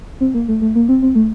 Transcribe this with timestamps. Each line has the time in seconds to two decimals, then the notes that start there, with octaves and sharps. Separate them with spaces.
0.20 C4
0.34 A#3
0.48 A3
0.62 A3
0.75 A#3
0.89 C4
1.02 C4
1.15 A3